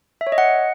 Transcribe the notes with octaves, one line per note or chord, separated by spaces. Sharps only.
E5
C#5
D#5
F#5